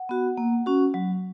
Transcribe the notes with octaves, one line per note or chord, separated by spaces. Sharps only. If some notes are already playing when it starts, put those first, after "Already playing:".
Already playing: F#5
B3 F#4
A#3
C#4 F#4
F#3